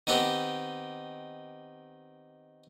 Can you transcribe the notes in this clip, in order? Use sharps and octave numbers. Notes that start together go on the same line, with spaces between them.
D#3 B3 C4 G4